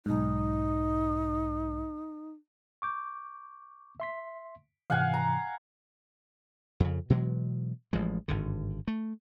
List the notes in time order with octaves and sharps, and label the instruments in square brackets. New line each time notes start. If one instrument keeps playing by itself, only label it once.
[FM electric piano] B1 G#2 [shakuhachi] D#4
[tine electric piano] C#6 D6 G6
E5 C6 B6
[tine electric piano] G#2 C3 E3 [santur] F5 F#5 G#5
[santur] A#5
[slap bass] F2 C#3
B2 E3 F#3 G#3
A1 F3 G#3
G#1 G2 D3
A3